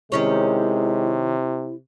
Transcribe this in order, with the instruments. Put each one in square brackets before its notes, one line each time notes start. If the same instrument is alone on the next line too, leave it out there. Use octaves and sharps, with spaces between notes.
[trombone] C3 [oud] D#3 C#4 C#5 [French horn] G#3 [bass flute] E4